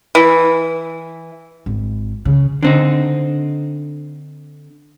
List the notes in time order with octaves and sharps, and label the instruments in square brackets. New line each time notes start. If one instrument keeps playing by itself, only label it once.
[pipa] E3
[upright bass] G#1
C#3
[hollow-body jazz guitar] D3 C4 D#4